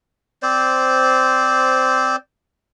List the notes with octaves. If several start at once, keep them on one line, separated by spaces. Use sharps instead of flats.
C4 C5 D5